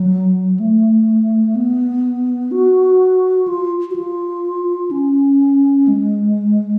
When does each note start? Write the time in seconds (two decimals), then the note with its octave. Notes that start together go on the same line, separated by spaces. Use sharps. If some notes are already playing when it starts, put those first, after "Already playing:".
Already playing: F#3
0.59 A3
1.55 B3
2.51 F#4
3.48 F4
3.90 F#4
3.96 F4
4.91 C#4
5.88 G#3